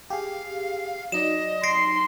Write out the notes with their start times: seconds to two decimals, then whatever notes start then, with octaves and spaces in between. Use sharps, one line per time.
0.10 G4 G#4 F5
1.12 F#3 D#4 D5 D#5 E7
1.63 C6 A#6 C7 D7